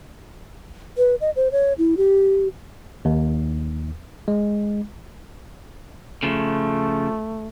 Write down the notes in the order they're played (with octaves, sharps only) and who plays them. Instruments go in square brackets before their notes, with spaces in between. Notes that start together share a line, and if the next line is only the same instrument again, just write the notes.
[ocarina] B4
D#5
C5
C#5
E4
G4
[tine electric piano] D#2
G#3
[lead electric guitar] C#3 F3 [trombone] A3